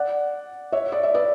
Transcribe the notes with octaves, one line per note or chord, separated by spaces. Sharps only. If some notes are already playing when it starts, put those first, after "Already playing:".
Already playing: D5 F#5
C#5 E5
D5
E5
B4 D5